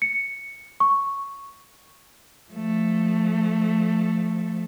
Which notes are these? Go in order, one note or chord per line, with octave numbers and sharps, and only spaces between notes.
C#7
C#6
F3 A3